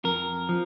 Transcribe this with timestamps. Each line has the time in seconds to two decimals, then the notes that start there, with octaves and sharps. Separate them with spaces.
0.04 F2 A#4
0.49 F3